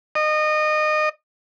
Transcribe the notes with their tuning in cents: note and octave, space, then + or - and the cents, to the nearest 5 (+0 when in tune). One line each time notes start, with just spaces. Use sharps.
D#5 -25